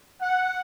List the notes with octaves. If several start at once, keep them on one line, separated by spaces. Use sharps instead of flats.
F#5